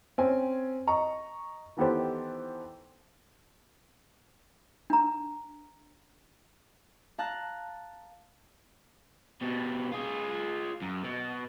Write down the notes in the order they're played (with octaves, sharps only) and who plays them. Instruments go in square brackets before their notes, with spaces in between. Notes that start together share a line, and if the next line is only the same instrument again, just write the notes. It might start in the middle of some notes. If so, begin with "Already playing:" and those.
[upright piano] C4 C#4 C5 G#5
D#5 A#5 C#6
D#3 E3 B3 G4 A4 C5
[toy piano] D4 A#5
[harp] F5 A5 A#5 F#6
[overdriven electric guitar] B2 G3
F4 G#4
F#2
B2